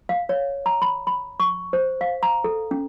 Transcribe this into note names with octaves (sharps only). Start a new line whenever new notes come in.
F5
C#5
A#5
B5
B5
C#6
C5
F5
A#5
A4
C#4